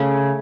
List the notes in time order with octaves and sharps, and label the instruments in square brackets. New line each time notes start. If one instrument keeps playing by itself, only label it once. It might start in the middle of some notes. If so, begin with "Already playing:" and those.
Already playing: [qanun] C#3 A3